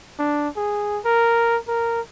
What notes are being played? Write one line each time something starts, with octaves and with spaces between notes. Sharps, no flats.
D4
G#4
A#4
A#4